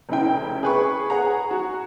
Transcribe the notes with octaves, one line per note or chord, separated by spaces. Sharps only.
F1 C#3 E4 G5
G#4 B4 C#6
G#4 F#5 A#5
F#4